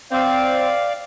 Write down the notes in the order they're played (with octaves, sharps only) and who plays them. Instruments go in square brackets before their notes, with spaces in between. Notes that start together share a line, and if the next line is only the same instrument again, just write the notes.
[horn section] C4 [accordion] D5 F5